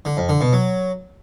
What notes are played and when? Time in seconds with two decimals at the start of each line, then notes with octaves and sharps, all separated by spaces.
0.05 D3
0.17 F2
0.29 D3
0.41 B2
0.53 F#3